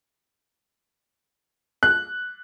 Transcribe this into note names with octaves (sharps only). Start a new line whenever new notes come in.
F#6